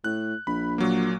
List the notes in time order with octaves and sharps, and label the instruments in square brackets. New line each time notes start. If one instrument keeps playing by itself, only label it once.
[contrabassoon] A2 [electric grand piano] F#6
[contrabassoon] A#1 [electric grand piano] B5
[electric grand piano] A#2 F#3 A#3